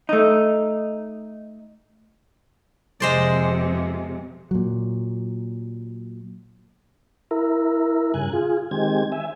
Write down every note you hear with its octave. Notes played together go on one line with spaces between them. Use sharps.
A3 D#4
F2 C3 G#3 C5 D5
A#2 F#3
E4 A#4
G2 C#3 G#5 F#6
F4 G#4
D#3 G#3 C4 G4 G#6
E5 G#5